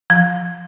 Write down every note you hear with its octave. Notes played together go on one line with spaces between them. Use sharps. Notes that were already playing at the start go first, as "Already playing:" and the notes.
F3